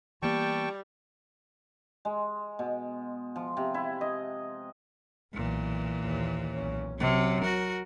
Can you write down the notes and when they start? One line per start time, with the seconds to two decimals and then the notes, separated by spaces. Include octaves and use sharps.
0.22 E3 G3 A#3 B3 G5 A5 C#6
2.05 G#3
2.59 B2
3.36 F3
3.57 C3
3.74 E4
4.01 D#5
5.34 B1 A#2 E3
6.00 D#2
6.55 B1 C#4
6.99 C3 F#3 C#4
7.41 F#4 A#4